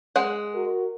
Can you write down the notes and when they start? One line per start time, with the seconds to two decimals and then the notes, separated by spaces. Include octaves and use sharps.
0.16 G#3 G#4 F#5
0.55 F#4 A#4